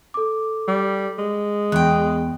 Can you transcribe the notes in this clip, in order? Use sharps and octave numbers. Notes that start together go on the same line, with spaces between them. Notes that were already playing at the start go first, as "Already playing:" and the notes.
A4 D6
G3
G#3
E2 G5 F#6